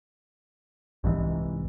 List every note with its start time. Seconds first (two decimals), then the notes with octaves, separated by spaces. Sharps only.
1.04 C2 G#2 E3